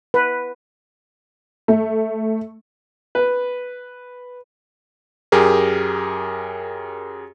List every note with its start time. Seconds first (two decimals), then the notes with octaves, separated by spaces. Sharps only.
0.14 B4
1.68 A3
3.15 B4
5.32 F#2 G4 G#4 A#4